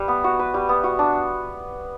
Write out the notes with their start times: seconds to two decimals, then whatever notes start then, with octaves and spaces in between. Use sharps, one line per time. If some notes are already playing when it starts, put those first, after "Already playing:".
Already playing: G3 B4
0.08 B3
0.24 F#4
0.39 B4
0.54 G3
0.69 B3
0.84 F#4
0.99 D4